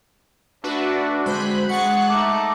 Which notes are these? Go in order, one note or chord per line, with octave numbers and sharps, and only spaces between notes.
A3 D4 F#4 B4
D3 G#3 C4 F#4 G#4 C5 B5 F#6
G#3 G#4 F#5 C#6 F#6 A6 C#7
A3 D#4 D6